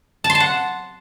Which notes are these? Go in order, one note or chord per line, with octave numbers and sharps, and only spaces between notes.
A5
C6
A5
F#5